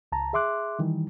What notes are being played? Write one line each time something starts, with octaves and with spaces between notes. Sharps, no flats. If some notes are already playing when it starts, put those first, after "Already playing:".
C#2 A5 A#5
G#4 E5 C6 D6 F#6
D#3 E3 G3